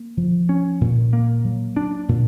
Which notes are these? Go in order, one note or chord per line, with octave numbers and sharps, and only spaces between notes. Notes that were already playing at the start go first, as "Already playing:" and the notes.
Already playing: A#3
F3
C#4
A#2
A#3
F#3
D4
A#2